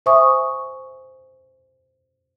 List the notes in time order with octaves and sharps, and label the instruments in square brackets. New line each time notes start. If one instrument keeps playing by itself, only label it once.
[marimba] C5 E5 G#5 C#6 D#6